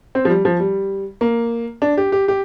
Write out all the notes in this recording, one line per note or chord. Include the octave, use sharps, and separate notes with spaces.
C4
F3
G3
F3
G3
A#3
D4
G4
G4
G4